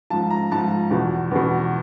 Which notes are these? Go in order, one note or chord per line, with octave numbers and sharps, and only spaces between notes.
G#2 F3 A5
A#5
G#2 F3 A5
E2 B2
E2 B2